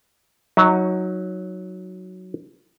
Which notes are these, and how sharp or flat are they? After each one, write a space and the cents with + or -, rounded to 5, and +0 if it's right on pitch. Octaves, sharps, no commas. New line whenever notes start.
F#3 +0 D#4 +25